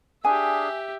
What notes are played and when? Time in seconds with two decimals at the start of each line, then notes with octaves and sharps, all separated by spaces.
0.25 D4 G4 G#4 E5 G#5